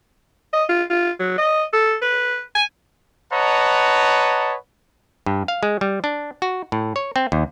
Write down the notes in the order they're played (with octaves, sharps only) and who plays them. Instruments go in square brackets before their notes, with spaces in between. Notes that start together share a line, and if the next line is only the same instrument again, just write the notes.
[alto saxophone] D#5
F4
F4
F#3
D#5
A4
B4
G#5
[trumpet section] B4 C#5 D#5 F#5 A5 A#5
[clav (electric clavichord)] G2
F5
G#3
G3
D4
F#4
A2
C#5
C4
D#2